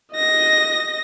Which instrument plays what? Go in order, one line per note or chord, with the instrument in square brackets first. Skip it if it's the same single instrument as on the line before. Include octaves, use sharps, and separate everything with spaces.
[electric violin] D#5 A#6